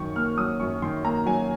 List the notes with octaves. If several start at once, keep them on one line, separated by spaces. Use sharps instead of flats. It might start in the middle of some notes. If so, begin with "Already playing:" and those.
Already playing: F#2 D#3 F#3 C#6
A#3 F6
F#3 D#6
F#2 C#6
D#3 C6
A#3 A#5
F#3 G#5